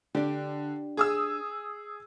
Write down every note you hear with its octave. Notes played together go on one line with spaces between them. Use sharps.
D3 D4 G4
G#4 D#6 E6